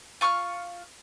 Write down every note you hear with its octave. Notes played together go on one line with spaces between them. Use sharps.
F4 C#6 E6 F6